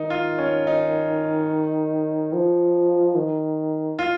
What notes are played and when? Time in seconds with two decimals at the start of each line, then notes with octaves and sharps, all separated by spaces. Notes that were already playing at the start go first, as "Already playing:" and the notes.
Already playing: D#3 D#4
0.10 F4
0.38 C#4
0.67 D#4
2.33 F3
3.16 D#3
3.99 F4